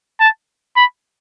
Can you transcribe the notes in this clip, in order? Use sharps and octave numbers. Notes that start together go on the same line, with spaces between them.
A5
B5